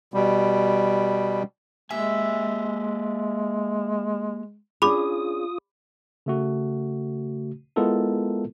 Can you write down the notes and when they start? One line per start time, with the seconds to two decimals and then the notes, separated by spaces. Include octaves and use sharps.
0.14 B2 G3
1.90 G#3 A#3 G4 E5 G#5
4.82 C#4 D4 F4 G#4 B5 D6 D#6
6.26 C#3 A3 F#4
7.76 G#3 B3 E4 F4 A4 A#4